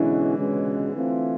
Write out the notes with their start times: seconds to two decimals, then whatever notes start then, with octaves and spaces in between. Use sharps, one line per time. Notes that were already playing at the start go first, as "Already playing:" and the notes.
Already playing: B2 D3 E3 G#3 C#4 E4
0.38 C#2 B2 G#3 C#4
0.93 E3 A3 C4 F4